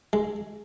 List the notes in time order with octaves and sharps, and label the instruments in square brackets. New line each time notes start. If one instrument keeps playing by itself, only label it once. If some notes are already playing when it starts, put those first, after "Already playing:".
[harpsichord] G#3